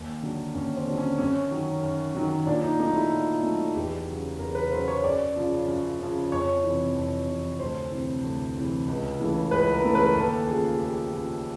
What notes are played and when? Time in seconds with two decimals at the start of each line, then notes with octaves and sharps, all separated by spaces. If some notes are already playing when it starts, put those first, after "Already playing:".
Already playing: D#2
0.23 D3 F#3
0.55 D#2 C#4
0.77 C4
0.87 D3 F#3
0.97 C#4
1.18 F#2 C#4
1.51 D#3 F#3
1.83 F#2
2.15 D#3 F#3
2.47 A#2 D4
2.62 D#4
2.79 A3 D#4
2.83 F#3
2.95 E4
3.12 A#2
3.43 F#3 A3
3.75 E2 G4
4.07 C#3 F#3
4.39 E2 A#4
4.55 B4
4.71 C#3 C5
4.74 F#3
4.88 C#5
5.03 F#2 D5
5.36 C#3 F3
5.67 F#2
5.99 C#3 F3
6.32 F2 C#5
6.64 C3 E3
6.95 F2
7.28 C3 E3
7.59 D2 C5
7.92 C3 E3
8.24 D2
8.56 C3 E3
8.88 C#2
9.20 C#3 E3 A3
9.51 C#2 B4
9.73 A#4
9.85 C#3 E3 A3
9.95 B4
10.15 D#2 A4
10.48 C#3 F3 G#4
10.75 G4
10.80 D#2 G#4
11.12 C#3 F3